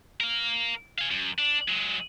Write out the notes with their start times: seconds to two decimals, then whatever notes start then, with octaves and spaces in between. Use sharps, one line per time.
0.21 A#4 F5
0.99 F5 G#5
1.11 F#2
1.38 D4
1.68 F#3 G#3